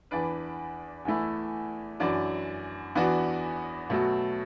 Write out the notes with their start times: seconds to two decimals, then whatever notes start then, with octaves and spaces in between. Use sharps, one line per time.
0.11 E2 E3 D4 B4 D5
1.05 E2 E3 A3 E4
2.00 F#2 E3 D4 F#4 D5
2.95 E2 E3 B3 D4 F#4
3.90 B2 F#3 A3 F#4